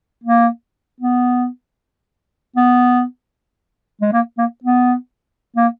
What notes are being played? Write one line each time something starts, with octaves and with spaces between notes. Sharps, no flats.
A#3
B3
B3
G#3
A#3
A#3
B3
A#3